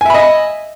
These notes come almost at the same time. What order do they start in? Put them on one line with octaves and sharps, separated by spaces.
G#5 E5 B5 D#5